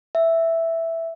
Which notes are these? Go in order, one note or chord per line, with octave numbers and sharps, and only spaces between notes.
E5